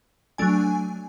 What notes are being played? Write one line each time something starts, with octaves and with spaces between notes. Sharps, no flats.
F#3 A3 D4 G#5